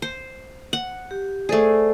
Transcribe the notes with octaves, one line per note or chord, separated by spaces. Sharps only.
C5
F#5
G4
A3 G#4 A4 C5 D5